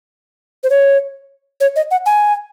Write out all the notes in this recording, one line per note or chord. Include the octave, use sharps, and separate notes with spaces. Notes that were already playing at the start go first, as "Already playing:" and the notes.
C5
C#5
C#5
D#5
F#5
G#5